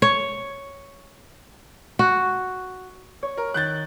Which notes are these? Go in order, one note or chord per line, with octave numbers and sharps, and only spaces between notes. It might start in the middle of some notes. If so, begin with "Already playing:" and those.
C#5
F#4
C#5
A#4
D#3 F#6 G6 A6